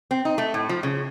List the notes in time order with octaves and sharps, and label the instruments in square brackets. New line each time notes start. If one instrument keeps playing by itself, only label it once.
[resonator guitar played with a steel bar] C4
D#4
A3
A2
F3
C#3